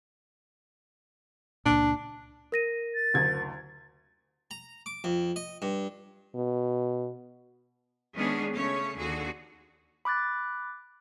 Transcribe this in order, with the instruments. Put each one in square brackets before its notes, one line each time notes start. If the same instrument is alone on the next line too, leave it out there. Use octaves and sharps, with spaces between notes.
[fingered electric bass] C#2 A#2 [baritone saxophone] D4
[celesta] A#4 A#6 D#7
[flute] A6
[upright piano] F#1 D2 G#6
[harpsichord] A#5
D6
F2
D#5
G2
[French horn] B2
[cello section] D#3 G#3 B3 C#4 D4 G#4
C#3 A3 C#4 C#5
D#2 D3 F#4 G#4
[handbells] B5 D6 F#6 A6